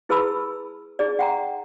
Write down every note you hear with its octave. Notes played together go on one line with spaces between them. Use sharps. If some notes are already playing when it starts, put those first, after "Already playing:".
E4 G#4 B4 A5 B5 E6
D#4 G#4 D5
F#5 G5 A#5